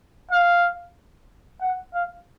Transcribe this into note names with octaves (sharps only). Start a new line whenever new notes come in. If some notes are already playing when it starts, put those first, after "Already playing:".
F5
F#5
F5